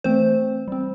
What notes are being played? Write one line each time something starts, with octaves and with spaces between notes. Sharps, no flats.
E3 A3 C4 C5
G3 C4